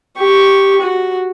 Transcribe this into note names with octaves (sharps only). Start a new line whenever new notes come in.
G4 C#6
F#4